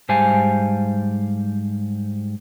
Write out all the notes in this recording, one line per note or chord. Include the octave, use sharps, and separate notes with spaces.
G#2 G3 C5 F5 G#5 A5